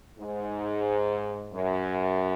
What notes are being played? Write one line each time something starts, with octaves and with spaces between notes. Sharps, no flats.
G#2
F#2